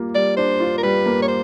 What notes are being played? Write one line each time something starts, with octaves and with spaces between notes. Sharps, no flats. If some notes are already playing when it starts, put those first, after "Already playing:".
Already playing: G3 A#3 F4
G3 D5
D4 C5
F4
A#4
G3 B4
A#3
C#5
C5